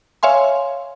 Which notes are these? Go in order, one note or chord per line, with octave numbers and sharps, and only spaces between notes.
C#5 E5 F5 G#5 C6